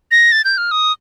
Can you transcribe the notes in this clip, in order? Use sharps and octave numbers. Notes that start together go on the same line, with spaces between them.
A#6
A6
G6
F6
D#6